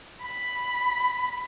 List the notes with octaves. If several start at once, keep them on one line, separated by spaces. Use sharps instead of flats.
B5